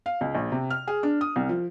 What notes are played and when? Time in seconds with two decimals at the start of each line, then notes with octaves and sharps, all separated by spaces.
0.06 F5
0.21 C#2
0.35 A#1
0.52 C3
0.70 F6
0.87 G#4
1.03 D4
1.21 D#6
1.36 C2
1.49 F3